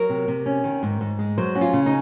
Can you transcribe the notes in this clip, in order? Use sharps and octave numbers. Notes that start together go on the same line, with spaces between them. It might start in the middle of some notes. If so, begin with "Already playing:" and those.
Already playing: F#3 A#4
C3
C3
C#4
D#3
G#2
G#2
G#3
F#3 C5
C#4 F#4
F4
C#3
D#4